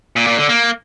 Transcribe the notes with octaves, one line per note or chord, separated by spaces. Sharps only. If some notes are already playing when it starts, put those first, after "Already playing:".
A#2
A#2
D3
A#3